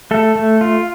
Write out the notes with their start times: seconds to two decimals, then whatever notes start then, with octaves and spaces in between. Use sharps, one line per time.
0.11 A3 A4
0.36 A3
0.61 F4